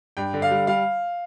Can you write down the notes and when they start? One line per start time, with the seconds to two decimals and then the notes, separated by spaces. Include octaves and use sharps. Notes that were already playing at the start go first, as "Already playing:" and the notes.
0.17 G2 G5
0.34 D3
0.42 F5
0.51 G3
0.67 G3 F5